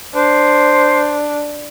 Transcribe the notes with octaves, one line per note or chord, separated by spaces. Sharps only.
D4 C5